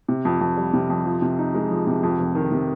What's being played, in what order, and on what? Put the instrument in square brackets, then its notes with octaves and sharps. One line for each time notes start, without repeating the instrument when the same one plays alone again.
[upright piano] C3
F2
F2
G3
C3
F2
F3
C3
D#4
G#3
F3
C3
F2
F1
D#3
C3